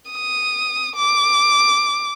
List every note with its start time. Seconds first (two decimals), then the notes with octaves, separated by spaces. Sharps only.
0.11 D#6
0.95 D6